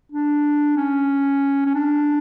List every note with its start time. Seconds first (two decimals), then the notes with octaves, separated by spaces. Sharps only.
0.12 D4
0.77 C#4
1.66 C#4
1.75 D4